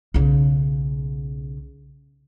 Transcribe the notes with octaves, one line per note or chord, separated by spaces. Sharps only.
B1 C#3